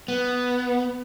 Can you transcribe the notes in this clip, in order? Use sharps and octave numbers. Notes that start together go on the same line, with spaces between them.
B3